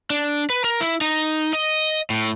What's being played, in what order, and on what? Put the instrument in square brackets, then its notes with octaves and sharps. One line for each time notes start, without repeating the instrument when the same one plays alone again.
[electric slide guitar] D4
B4
A#4
E4
D#4
D#5
A2